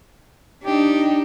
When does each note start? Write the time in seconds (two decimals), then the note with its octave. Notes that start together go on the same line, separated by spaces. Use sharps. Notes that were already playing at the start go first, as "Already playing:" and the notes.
0.64 D4 D#4 G4